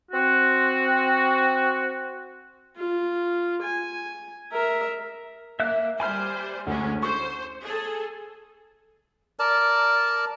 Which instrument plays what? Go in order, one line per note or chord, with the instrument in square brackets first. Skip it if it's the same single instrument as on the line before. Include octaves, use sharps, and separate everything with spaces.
[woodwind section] C4 F#4
[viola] F4
G#5
A#4 E5
[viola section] A#3 [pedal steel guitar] E5 F#6
[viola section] G3 C5 [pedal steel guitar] G#5 B5 F6
[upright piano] D2 [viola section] G#3 C#4 D4
[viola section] C5 [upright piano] C#6
[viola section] G#4 A4
[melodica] A#4 D5 A5